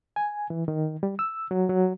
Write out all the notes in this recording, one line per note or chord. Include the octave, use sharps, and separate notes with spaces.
G#5
E3
D#3
G3
E6
F#3
F#3